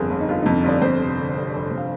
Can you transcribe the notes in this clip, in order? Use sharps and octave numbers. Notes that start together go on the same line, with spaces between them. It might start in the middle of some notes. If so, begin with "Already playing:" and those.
Already playing: G1 F2 G#4 A#4
G1
D#4
G1 F4
D#4
F2
D#4
G1 D5
F2 C5
F1
D3
F1
F1
F2
F5